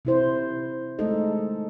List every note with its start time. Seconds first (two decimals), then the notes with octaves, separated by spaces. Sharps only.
0.05 C3 E4 C5
0.99 G#3 A3 D#4 A4 D#5